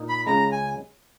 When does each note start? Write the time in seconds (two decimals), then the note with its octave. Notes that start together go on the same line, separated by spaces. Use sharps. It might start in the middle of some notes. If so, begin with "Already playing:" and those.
Already playing: A#2 D#4
0.09 B5
0.26 C#2 C#3 G#3 A#5
0.52 G#5